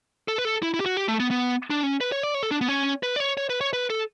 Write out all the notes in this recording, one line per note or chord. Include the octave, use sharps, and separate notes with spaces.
A4
B4
A4
E4
E4
G4
F#4
G4
A3
B3
B3
D4
C#4
B4
C#5
D5
C#5
A4
D4
B3
C#4
B4
D5
C#5
C#5
B4
C#5
B4
A4